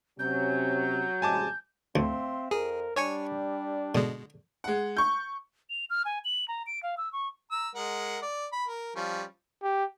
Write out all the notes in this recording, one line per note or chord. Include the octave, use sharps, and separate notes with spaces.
C3 F#3 C#4 G6
A1 C3 G#3 G#5 A5 D6
D2 C4 E5 F5 C6
F2 G#4 A#4
G3 D4 C#5 G#5 C#6
B2 D3 G#3
G#3 F#5
C#6 G6
F7
F6
G#5
F#7
A#5
D7
F5
E6
C#6
A#5 E6
G#3 A#4 F#5
D5
B5
A#4
F3 G3 C#4
G4